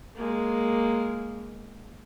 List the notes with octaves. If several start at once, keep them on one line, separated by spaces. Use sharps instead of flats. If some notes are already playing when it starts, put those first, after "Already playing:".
G#3 A#3